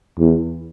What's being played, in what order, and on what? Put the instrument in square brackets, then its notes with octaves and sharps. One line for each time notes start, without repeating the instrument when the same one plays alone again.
[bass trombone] E2